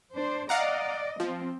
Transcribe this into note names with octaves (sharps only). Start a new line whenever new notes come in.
D4 C5
D5 D#5 F5 F#5 A#5
F3 C4